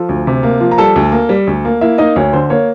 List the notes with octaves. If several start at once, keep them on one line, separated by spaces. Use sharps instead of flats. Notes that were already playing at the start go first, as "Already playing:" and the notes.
Already playing: F3 A4
D2
C3
A#3
F3
A#5
G3 A4 A5
D2
A#3
G3
D2
A#3
A#3 E4 E5
A#3 D#4 D#5
D2 C#5
D3 C5
A#3 C#5